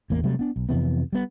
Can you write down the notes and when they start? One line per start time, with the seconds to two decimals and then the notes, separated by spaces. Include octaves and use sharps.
0.10 A1 E2 A#3
0.24 C3 F#3 G3 A3
0.39 B3 D4
0.56 B1
0.69 F2 C3 E3 B3
1.13 G3 B3